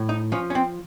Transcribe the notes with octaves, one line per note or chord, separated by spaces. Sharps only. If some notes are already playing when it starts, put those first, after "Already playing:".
Already playing: A2
D#4
F3 C#4
C#4
C4